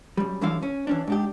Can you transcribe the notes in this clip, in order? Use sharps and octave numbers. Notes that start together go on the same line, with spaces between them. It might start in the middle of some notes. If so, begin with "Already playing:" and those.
F#2 G3
F#2 D3 E3 G3 E4 F5
C#4
E3 C#4 D4
G#2 D4 G4